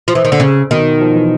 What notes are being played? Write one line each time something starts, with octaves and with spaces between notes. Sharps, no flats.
F3
E3
D#3
D3
C#3
B2 D#3
F3
E3